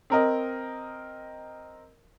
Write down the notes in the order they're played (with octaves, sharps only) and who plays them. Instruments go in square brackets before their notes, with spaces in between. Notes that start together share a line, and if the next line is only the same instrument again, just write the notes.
[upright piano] C4 A#4 D#5